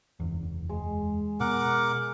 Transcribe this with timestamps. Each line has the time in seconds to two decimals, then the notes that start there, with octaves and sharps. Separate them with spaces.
0.20 F#1 E2
0.69 G#3
1.40 B2 A#4 F#5 D6